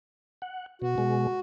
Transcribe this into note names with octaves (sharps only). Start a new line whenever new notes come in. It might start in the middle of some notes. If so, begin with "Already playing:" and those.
F#5
B2 F#4
B2 G#3